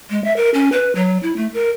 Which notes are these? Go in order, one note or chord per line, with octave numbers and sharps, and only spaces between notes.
G#3
E5
A#4
C#4
B4
F#3
E4
A3
A#4